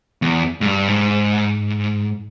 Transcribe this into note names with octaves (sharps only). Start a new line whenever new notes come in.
E2
G#2
G2
G#2